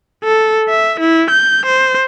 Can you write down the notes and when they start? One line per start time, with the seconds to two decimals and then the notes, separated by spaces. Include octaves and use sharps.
0.24 A4
0.69 E5
1.00 E4
1.30 G6
1.66 C5